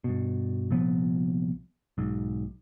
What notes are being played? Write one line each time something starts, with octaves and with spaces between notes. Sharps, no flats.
G2 B2
C2 A#2 F3 B3
B1 G#2